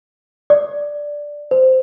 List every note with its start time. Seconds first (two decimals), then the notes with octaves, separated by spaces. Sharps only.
0.50 D5
1.51 C5